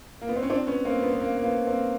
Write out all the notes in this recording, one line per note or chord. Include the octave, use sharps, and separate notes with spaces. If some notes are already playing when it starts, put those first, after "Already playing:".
A#3
B3
C4
C#4
C4 D4
B3 C#4
A#3 C4
B3
B3
A#3
A#3
B3
A#3 C4